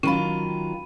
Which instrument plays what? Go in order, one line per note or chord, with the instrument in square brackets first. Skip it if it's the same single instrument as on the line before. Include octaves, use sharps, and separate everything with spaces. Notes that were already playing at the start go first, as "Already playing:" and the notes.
[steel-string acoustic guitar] D#3 F#3 F4 [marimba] C#4 [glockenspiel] B5 D#7